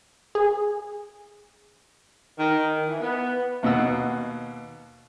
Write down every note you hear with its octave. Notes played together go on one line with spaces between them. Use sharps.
G#4
D#3
E3
B3
D#2 B2 F#5 E6